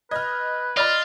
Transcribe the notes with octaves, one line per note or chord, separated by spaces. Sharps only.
B4 D#5 F6 G#6
F4 D5 D#5 B5 F6 A6